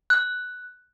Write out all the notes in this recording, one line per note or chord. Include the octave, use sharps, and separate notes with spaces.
F#6